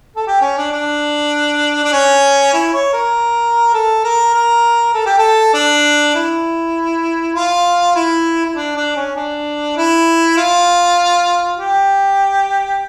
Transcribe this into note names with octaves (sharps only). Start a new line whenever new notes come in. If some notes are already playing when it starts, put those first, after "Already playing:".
A4
G4
C#4
D4
D4
D4
C#4
E4
C#5
A#4
A4
A#4
A#4
A4
G4
A4
D4
E4
F4
E4
E4
D4
D4
C#4
D4
E4
F4
G4